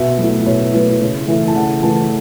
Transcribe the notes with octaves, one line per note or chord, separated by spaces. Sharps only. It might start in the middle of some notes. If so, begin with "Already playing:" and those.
Already playing: B2 E5
F#3 A3 E4
B2 C#5
F#3 A3 E4 B4
C#3 C#5
E3 A3 E4 E5
A5
C#3 F#5
E3 A3 E4 A5